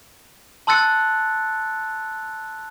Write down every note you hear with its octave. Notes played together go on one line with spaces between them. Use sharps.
A5 C6 E6 F#6 A6 C#7